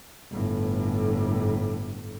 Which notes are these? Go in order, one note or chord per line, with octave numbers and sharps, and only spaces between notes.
G1 A2